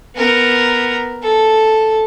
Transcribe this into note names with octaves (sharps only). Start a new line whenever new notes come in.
B3 A#4
A4